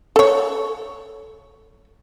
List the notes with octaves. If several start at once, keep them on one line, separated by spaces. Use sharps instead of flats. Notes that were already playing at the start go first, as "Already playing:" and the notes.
A4 C#5